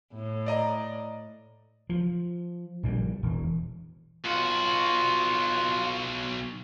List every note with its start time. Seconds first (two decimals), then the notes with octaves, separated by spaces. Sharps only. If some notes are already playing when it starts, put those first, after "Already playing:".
0.14 A2
0.46 D5 D#5 A#5
1.89 F3
2.83 A#1 A#2 G3
3.23 E1 E3
4.25 B1 F4 F#4